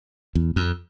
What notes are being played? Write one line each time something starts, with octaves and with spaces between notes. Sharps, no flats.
E2
F2